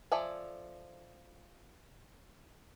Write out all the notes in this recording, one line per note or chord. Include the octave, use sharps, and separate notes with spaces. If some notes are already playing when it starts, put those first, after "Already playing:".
F3 A4 D5 E5 G#5